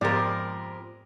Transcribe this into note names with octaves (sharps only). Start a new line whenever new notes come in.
F2 G#2 F3 G#3 B3 G4 A#4 D5